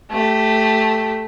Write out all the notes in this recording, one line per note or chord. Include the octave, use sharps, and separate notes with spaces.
A3 G4